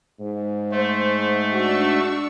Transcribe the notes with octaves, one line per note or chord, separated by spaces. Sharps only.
G#2
A3 C5
D4 F#4 C#6 E6